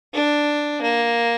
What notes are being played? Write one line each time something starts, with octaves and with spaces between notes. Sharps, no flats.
D4
A#3